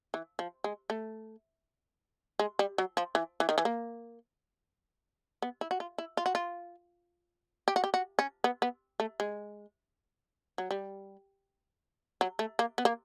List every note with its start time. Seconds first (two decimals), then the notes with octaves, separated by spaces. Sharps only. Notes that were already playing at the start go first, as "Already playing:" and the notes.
0.14 E3
0.39 F3
0.64 G#3
0.90 A3
2.39 G#3
2.59 G3
2.78 F#3
2.97 F3
3.15 E3
3.40 E3
3.49 D#3
3.58 E3
3.65 A#3
5.42 B3
5.61 E4
5.71 F#4
5.80 F4
5.98 E4
6.17 F4
6.26 F#4
6.35 F4
7.68 G4
7.76 F#4
7.84 G4
7.94 F#4
8.19 C#4
8.44 B3
8.62 B3
9.00 A3
9.20 G#3
10.58 F#3
10.71 G3
12.21 F#3
12.39 A3
12.59 A#3
12.78 B3
12.85 A#3